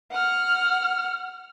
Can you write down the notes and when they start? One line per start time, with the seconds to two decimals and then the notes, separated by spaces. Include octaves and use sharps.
0.11 F#5 F6